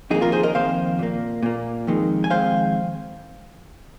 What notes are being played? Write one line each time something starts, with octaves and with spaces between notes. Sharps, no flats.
F2 D#3 A#3 D#4 G#4
F4 A#4
G#4 C5
A#4 D#5
F2 D#3 A#3 C5 F5
A#2 A#3
A#2 A#3
F2 D#3 G#3
G#5
F2 D#3 G#3 C5 F5